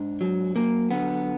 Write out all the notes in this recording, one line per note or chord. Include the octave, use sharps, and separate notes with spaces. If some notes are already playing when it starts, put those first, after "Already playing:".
Already playing: G#2 D4
F#3
F#3 A#3
D3 B3